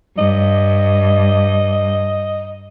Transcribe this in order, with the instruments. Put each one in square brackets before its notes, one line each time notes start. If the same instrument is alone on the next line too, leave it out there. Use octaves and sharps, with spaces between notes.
[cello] G2 [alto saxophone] D#5